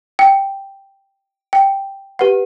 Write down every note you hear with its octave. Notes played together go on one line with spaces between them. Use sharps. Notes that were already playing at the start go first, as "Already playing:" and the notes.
G5
G5
G4 B4 F#5